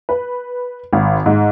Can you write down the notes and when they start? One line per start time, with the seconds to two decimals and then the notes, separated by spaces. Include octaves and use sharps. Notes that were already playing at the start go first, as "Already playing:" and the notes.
0.09 B4
0.93 G#1
1.26 G#2